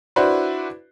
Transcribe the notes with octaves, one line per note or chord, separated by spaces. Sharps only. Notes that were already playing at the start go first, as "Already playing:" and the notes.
D4 E4 F#4 B4 C5 D5